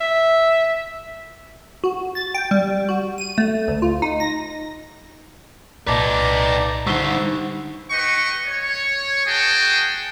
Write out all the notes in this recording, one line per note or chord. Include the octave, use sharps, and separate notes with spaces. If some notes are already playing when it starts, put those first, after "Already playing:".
E5
F#4
A6
G5
G3
F#4
D#7
A3
D2
F4
D#4
A#6
C2 A#2 D#4 B4 D5 A5 A#5
D3 G3 D#4 C5 F#5 C#6 E6
G4 B4 D#5 C#6
C#5
F#4 G#4 G5 A5